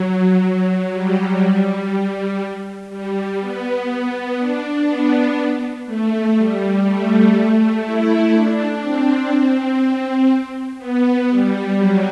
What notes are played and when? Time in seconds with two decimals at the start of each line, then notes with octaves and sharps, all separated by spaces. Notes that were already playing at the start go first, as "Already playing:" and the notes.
Already playing: F#3
0.44 F#3
0.93 G3
1.42 G3
2.90 G3
3.40 B3
4.38 D4
4.87 B3
5.86 A3
6.36 G3
6.85 A3
7.34 A3
7.84 E4
8.33 D4
8.82 C4
9.31 C4
10.78 B3
11.29 G3
11.78 F#3